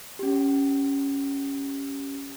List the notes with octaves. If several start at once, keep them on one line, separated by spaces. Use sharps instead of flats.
C#4 G4